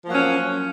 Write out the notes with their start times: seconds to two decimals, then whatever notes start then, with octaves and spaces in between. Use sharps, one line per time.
0.05 F3
0.08 A#3
0.11 F#3
0.14 C#4